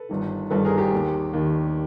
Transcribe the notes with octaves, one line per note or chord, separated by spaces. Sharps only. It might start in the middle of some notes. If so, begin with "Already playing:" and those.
Already playing: A4 B4
G1 G2 D#3
G1 G2 D#3 A4 B4
G#4 A#4
G4
D#2 D#3
D#2 D#3